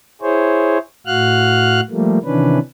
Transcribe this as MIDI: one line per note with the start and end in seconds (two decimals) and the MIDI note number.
0.22 0.78 64
0.22 0.78 68
0.22 0.78 72
0.22 0.78 73
1.06 1.81 45
1.06 1.81 66
1.06 1.81 77
1.06 1.81 89
1.06 1.81 90
1.91 2.18 53
1.91 2.18 55
1.91 2.18 57
1.91 2.18 58
2.24 2.59 48
2.24 2.59 51
2.24 2.59 52
2.24 2.59 61
2.24 2.59 62
2.24 2.59 71